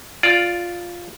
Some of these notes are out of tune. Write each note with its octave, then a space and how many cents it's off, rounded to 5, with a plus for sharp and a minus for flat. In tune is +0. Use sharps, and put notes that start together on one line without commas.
F4 +0 D5 +0